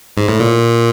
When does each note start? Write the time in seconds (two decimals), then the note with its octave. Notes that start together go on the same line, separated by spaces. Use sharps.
0.17 G#2
0.29 A2
0.40 A#2